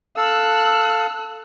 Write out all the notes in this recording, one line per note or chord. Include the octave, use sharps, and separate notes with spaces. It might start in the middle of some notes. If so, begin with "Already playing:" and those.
A4 F5 E6 F#6